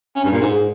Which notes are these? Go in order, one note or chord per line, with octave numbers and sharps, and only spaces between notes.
C#4
G2
A#2
G#2